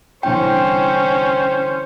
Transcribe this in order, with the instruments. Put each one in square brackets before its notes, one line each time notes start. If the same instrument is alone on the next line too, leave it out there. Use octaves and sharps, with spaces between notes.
[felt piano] C2 D3 E3 [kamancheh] C#4 [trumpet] C5 [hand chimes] G5